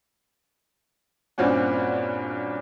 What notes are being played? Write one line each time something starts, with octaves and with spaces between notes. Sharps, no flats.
G2 A#2 C4 C#4 F#4